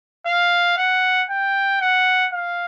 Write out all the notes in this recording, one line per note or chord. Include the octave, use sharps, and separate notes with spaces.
F5
F#5
G5
F#5
F5